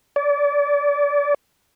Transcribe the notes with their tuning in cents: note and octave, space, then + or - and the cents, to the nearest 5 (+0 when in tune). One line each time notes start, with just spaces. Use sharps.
D5 -30